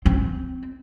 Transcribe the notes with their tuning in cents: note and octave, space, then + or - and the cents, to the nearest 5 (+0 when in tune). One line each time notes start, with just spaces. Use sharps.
C4 -15